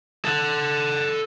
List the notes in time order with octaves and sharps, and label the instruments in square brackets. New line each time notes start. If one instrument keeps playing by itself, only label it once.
[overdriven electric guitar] A4 F#5